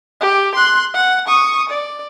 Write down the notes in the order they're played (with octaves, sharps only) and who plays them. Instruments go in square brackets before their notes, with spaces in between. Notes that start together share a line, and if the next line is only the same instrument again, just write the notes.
[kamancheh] G4
C6 F#6
F#5
C#6 D#6
D5